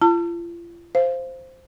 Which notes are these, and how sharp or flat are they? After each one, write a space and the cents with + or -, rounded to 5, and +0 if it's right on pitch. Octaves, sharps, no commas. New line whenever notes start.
F4 -40 A5 +35
C5 +0 F5 -15